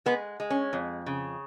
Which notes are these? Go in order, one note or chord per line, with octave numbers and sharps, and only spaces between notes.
G#3 B3
G#3
C#4
F2
C#3